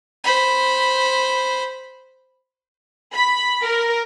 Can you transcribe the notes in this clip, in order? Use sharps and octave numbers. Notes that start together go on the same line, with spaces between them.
C5 B5
B5
A#4